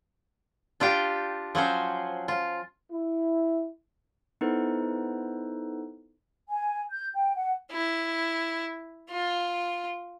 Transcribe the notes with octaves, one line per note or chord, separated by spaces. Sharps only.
D4 F4 G4 G5
F3 F#3 C#4 C5
F4
E4
B3 D#4 E4 A4 B4 C5
G#5
G6
G5
F#5
E4
F4